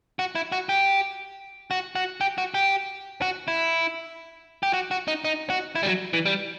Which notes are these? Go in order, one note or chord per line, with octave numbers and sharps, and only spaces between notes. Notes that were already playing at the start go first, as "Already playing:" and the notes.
F#4
E4
F#4
G4
F#4
F#4
G4
F#4
G4
F#4
E4
G4
F#4
F#4
D#4
D#4
F#4
E4
G3
F#3
E3
G3